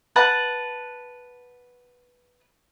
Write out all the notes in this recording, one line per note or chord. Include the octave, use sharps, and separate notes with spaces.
B4 F#5 A5